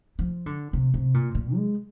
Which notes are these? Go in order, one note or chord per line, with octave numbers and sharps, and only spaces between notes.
F3
D3
C3
C3
A#2
A#2
G#3